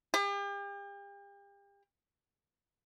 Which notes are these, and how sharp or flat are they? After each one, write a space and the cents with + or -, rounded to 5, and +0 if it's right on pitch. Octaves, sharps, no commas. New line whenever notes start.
G4 +40